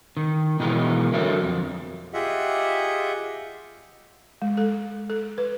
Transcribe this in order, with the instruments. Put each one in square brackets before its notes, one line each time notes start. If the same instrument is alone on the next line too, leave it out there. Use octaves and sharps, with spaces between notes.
[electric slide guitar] D#3
B2 E3 G#3 D#4 E4 A#4
D3 F#3 A#4 E5
F2
[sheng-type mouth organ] F4 G4 G#4 D#5 E5 F#5
[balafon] G#3
A4
A4
B4